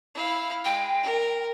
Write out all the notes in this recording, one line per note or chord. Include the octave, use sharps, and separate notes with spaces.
E4 F5
G#3 G5
A#4